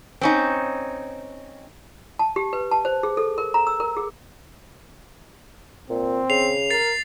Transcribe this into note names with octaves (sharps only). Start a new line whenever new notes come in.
C4 C#4 D#4
A5
G4
B4
A5
C5
G#4
A4
A#4
A#5
E6
A#4
G#4
A#2 C4
C#3 C7 F7
A#4 A6 C7